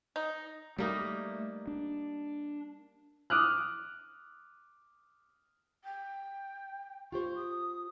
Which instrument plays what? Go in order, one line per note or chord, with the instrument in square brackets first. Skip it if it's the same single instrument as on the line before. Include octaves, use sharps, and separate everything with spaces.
[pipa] D#4
[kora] G3 A#3 D#4 [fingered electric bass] A3
[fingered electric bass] D4
[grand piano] D6 D#6 F6 F#6
[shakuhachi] G5
[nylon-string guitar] F4 G4 C5 [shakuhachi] C#6
[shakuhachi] D#6